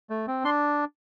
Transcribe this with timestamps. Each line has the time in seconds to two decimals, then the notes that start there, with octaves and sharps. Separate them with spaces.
0.10 A3
0.27 C4
0.44 D4 C6